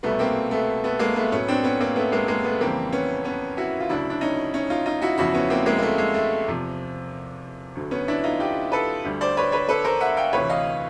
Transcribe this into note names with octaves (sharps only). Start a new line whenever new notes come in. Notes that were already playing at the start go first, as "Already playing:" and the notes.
C2 B2 G3 A3 B3
A#3 C4
A3 B3
A3 B3
G#3 A#3
A3 B3
A2 F#3 B3 C#4
C4 D4
B3 C#4
A#3 C4
A3 B3
G#3 A#3
G#3 A#3
A3 B3
F2 C#3 E3 G3 A#3 C4
B3 C#4
B3 C#4
E4 F#4
F4
D2 C#3 F#3 D4 E4
D4
C#4 D#4
C#4 D#4
D#4 F4
D#4 F4
E4 F#4
E2 C#3 F3 E4 F#4
B3 C#4
A#3 C4
G#3 A#3
A#3
A3
G#3
A3
E2 C3 F3
D2 D3 F#3
B3 C#4
D4 E4
D#4 F4
F4 G4
A4 B4
D2 D3 G3
C5 D5
B4 C#5
B4 C#5
A4 B4
A#4 C5
E5 F#5
F5 G5
D2 C3 E3 B4 C#5
D#5 F5